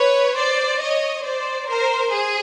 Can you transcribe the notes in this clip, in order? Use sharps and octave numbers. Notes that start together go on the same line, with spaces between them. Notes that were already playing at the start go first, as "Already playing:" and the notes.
Already playing: B4 C#5
C5 D5
C#5 D#5
C5 D5
A#4 C5
G#4